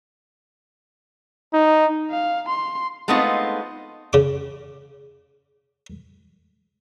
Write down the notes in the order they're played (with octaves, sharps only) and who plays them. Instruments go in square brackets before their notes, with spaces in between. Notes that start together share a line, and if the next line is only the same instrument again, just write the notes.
[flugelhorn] D#4
[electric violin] F5
C6
[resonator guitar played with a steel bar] G#3 A3 B3 C4 D#4 F4
[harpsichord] C#3 D6